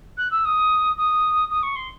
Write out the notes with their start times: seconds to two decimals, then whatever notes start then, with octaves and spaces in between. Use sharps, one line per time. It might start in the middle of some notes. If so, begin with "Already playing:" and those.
0.17 F#6
0.31 E6
0.45 D#6
0.97 D#6
1.50 D#6
1.63 C#6
1.76 C6